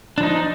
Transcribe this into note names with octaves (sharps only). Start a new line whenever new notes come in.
F3 D4 D#4